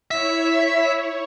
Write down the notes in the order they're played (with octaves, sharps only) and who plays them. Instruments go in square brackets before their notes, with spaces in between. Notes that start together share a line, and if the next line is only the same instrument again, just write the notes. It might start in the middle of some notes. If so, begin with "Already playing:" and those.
[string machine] E4 C#5 [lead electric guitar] E5